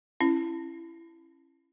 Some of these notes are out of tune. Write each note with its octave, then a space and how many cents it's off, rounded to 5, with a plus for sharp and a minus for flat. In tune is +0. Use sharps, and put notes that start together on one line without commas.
C#4 -20 E4 +20